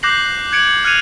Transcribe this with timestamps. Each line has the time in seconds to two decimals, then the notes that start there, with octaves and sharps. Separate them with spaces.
0.03 D6 F#6 G6 A#6 C7 F#7
0.24 F#6
0.52 F#6 G#6 C#7 D7 F#7
0.84 F6 F#6 G#6 C#7 D#7 F7